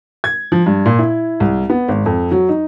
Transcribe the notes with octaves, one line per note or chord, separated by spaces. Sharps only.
G#6
F3
G2
A#2
E4
C2
B3
G#1
F2
F#3
D#4